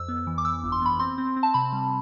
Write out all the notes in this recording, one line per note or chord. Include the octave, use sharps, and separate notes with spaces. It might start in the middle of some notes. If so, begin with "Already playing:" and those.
Already playing: F2 E6
B3
E3
D6
E3 E6
G1
C6
B3 B5
C4 C6
C4
C4
A5
C3 B5
G3